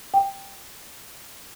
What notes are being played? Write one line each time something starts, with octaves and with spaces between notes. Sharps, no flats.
G5